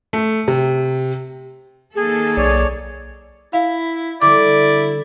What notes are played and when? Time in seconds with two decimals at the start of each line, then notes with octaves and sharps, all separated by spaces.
0.13 A3
0.48 C3
1.95 D#3 A#3 G#4 A4
2.37 B1 C#5 D5
3.53 E4 F5
4.22 D3 G3 E4 D5 D6